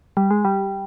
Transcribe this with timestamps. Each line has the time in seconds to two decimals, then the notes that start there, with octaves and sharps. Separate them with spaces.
0.17 G3
0.31 G#3
0.45 G3